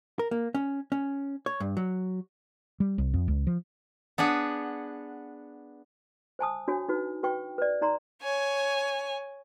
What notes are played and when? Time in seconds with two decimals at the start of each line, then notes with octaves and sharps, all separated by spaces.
0.19 A#4
0.31 A#3
0.55 C#4
0.92 C#4
1.46 C#5
1.60 G2
1.77 F#3
2.80 G3
2.98 C2
3.14 F2
3.28 C#2
3.47 F3
4.18 B3 D4 G#4 F#5
6.39 C5 G#5 A5 D#6
6.68 D4 F#4 C#5 G#5
6.89 D#4 F#4 B4
7.23 F#4 B4 G5 C#6
7.58 B4 D5
7.81 D#4 D5 A#5 C6
8.23 C#5 G#5